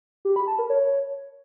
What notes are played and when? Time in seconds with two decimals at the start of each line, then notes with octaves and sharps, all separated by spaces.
0.25 G4
0.36 B5
0.47 A5
0.59 A#4
0.70 C#5